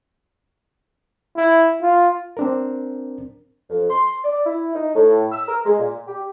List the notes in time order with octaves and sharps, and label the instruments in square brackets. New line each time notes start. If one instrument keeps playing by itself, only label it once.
[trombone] E4
F4
[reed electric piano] C4 D4 A#4
[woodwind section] F2
C6
D5
E4
D#4
A2
E6
A#4
G#3
A#2
G4